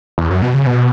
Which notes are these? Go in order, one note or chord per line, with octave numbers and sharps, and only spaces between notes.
E2
F#2
B2
C#3
B2